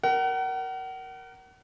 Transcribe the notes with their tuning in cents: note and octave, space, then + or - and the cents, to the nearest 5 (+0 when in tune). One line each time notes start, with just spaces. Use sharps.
A#4 +0 F#5 +35